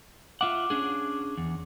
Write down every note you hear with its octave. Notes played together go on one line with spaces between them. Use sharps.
F4 E5 F#5 D6
C#4 D4 G#4
E2